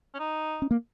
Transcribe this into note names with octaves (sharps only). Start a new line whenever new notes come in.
C#4
D#4
C#4
A#3